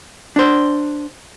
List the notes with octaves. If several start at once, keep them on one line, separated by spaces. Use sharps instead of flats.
D4 C5